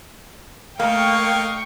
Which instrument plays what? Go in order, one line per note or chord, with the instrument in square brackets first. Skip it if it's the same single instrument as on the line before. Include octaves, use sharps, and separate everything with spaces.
[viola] A3 [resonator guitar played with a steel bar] A#3 [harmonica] D#5 F5 [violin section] G5 C#6